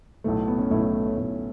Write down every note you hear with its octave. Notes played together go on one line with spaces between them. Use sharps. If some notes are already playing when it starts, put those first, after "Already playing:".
B1 A2 A3
B3
C#4
B1 A2 A3 E4
E4
A4
C#5
B1 A2 A3 B3